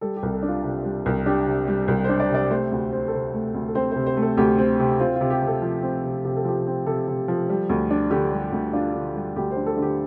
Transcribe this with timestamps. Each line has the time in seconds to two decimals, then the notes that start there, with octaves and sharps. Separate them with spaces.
0.01 G3 A4
0.17 G4
0.23 C2
0.33 A4
0.43 D4
0.48 F4
0.63 C3 F4
0.84 G3
1.06 C2
1.26 D4 G4
1.46 C3
1.68 G3
1.88 C2
2.04 D4 C5
2.20 D5
2.29 C3
2.35 D5
2.50 A3 C5
2.72 D2
2.92 C4
3.08 A4
3.12 C3 C5
3.34 A3
3.54 D2
3.68 A4
3.75 C4 C5
3.91 C3 C5
4.06 C5
4.17 A3
4.22 A4
4.37 D2 G4
4.58 C4
4.80 C3
5.00 C4 F4
5.16 F4
5.21 C3
5.30 G4
5.42 C3
5.47 A4
5.62 F3
5.82 C4
6.03 C3
6.25 C3 G4
6.36 A4
6.45 F3 G4
6.67 C4
6.86 C3 A4
7.08 C3
7.28 F3
7.50 G3
7.70 D2
7.91 D4
8.11 D3 G4
8.32 G3
8.52 D2
8.73 D4 F4
8.94 D3
9.16 G3
9.36 D2 G4
9.51 C5
9.57 D4
9.66 A4
9.77 D3
9.82 G4